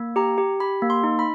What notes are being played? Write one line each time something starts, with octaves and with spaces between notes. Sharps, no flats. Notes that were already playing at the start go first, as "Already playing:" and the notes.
Already playing: A#3
G4 A#5
G4
G4 B5
A#3
C6
D#4
B5